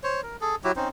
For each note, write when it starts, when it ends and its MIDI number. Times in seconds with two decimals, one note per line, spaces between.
0.03 0.21 72
0.03 0.21 73
0.23 0.37 70
0.41 0.56 68
0.41 0.56 69
0.64 0.72 54
0.64 0.72 64
0.64 0.72 66
0.64 0.72 67
0.76 0.89 60
0.76 0.89 61
0.76 0.89 63
0.76 0.89 72